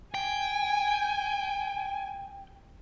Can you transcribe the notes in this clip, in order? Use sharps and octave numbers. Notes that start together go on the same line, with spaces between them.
G5 G#5